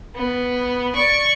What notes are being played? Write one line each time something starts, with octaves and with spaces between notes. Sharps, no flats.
B3
D5 C#6